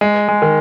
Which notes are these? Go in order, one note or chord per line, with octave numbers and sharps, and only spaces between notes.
G#3
G#3
D#3